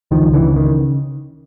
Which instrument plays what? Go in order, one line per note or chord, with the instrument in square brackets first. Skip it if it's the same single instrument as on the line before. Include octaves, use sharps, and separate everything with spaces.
[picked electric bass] C#2 D#3 F3
D3 E3
C#3
D#3